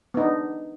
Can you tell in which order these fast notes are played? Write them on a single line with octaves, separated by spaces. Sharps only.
B3 D#4 D4